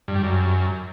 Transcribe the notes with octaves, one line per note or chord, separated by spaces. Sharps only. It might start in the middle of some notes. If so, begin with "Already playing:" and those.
G2
G3
F#2